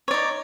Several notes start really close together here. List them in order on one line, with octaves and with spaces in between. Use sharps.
C#5 D5 D#4